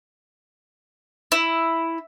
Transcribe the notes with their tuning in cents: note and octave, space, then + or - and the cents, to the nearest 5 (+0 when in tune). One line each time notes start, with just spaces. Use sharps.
E4 +0 E6 +5